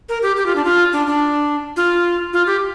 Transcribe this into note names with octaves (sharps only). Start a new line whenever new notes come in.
A#4
G4
G4
F4
D4
F4
D4
D4
F4
F4
G4